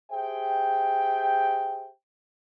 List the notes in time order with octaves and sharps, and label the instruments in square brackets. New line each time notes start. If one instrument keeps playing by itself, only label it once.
[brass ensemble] G4 G#4 C5 E5 G5